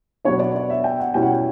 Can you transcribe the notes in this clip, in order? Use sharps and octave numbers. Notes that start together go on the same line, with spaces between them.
B2 F#3 B3 D4 C#5
D5
D5
E5
G5
F#5
B2 G3 C#4 E4 G5
F#5
G5